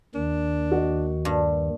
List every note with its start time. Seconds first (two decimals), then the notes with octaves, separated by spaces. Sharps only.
0.15 D#2 D#3 D4
0.72 F#4 D#5
1.25 G2